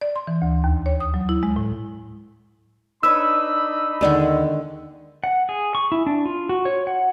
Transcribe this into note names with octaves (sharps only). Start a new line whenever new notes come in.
D5
C6
E3
D2
D#2
C#5
D#6
F#3
E4
G#3
A2
D4 D#4 B4 C#5 B5 E6
D#2 D3 D#3 G#3 D5 F#5
F#5
G#4
C#6
E4
D4
F4
F#4
C#5
F#5